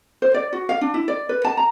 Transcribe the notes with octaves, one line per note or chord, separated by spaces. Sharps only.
C5
D5
F#4
F5
D4
E4
D5
B4
A5
A#5